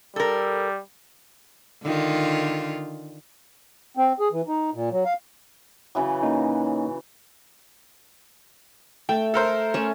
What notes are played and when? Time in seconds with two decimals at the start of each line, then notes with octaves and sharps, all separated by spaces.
0.16 G3 A4 A#4
1.83 D3 D#3 F4
3.97 C4
4.20 G#4
4.32 E3
4.48 D#4
4.74 A#2
4.91 F#3
5.05 F5
5.95 C#3 E3 F#3
6.23 A#3 C#4 D#4
9.09 A3 G5
9.34 A4 A#4 C5
9.74 A3 C#4